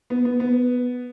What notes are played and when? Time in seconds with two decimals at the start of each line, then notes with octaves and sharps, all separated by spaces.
0.10 B3
0.25 B3
0.40 B3